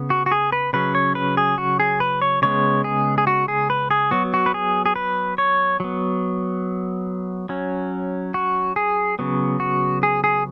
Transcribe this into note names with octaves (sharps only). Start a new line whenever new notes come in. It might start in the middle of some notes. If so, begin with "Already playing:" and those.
Already playing: C#3 B3
F#4
F#4
G#4
B4
C#3 F#3 C#4 B4
C#5
B4
G#4
F#4
G#4
B4
C#5
C#3 G#3 B3 C#5
G#4
G#4
F#4
G#4
B4
G#4
F#3 B3 F#4
F#4
B4
G#4
G#4
B4
C#5
F#3 B3
F#3 C#4
F#4
G#4
C#3 F#3 B3
F#4
G#4
G#4